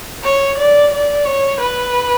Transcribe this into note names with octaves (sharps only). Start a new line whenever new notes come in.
C#5
D5
D5
C#5
B4